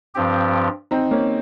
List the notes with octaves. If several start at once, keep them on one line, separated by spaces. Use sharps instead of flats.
G2 F3 C4 G4
C4 D#4
A#3 C#4